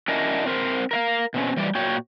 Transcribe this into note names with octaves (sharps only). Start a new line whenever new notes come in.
C#4 D4 E4 F#4 A#4 D#5
C4 A#4 C5
A#4 E5 F5
B2 C4 C#4
E3 G3 D5
A#2 F#4 C#5 G5